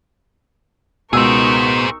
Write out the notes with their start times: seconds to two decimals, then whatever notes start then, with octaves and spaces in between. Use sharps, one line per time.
1.13 C#2 B2 D#4 G#4 A#4 C5 C#6 E6